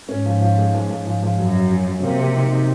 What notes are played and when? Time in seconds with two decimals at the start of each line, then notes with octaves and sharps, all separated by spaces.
0.09 G#2 C#4
0.25 F3
0.41 F3
0.58 G#3
0.74 F3
0.90 F3
1.06 F3
1.22 F3
1.38 F#2 F#3
1.55 F#3
1.71 F#3
1.87 F#3
2.03 C3 A#3
2.19 A#3
2.36 D#4
2.52 D#4